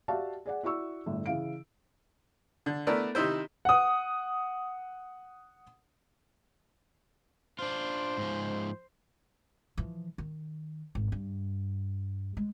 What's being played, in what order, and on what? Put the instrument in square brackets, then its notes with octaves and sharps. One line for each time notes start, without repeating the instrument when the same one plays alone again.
[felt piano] F#4 G4 D5 E5 F5 A5
G#4 D5 F#5
E4 F#4 D5 C#6 E6
G1 A2 D3
C#3 E3 F5 D7
[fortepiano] D3
A3 B3 D4 E4 A#4 D5
C3 D#3 D#4 E4 C5
[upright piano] F#5 D#6
[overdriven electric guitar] D4 F4 [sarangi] C5
[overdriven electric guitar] G#2 F3
[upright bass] E3 F3
D#3
G#1
G2
G#3